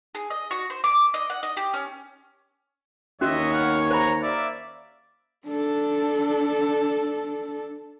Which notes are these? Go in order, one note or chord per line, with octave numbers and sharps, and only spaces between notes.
G#4
D#5
F#4
C5
D6
D#5
F#5
D#5
G4
C#4
D#2 C#4 F#4 C#5 D#5 E5
B3 F5 F#5
C5 A#5 B5
A#3 D5 E5
D4 A4